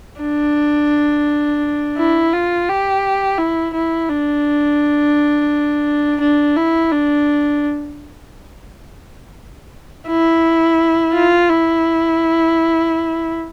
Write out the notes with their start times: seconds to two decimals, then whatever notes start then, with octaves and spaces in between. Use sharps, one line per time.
0.22 D4
1.98 E4
2.33 F4
2.69 G4
3.38 E4
3.74 E4
4.09 D4
6.20 D4
6.56 E4
6.91 D4
10.08 E4
11.14 F4
11.49 E4